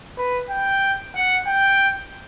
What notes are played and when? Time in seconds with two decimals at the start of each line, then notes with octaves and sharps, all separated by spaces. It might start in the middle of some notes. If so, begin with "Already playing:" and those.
0.18 B4
0.50 G5
1.15 F#5
1.47 G5